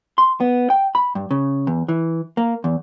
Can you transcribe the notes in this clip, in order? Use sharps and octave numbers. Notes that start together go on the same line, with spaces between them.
C6
B3
G5
B5
G2
C#3
E2
E3
A#3
E2